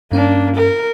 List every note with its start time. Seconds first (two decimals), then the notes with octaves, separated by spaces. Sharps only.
0.12 G2 A#3 C#4 D4
0.55 A#4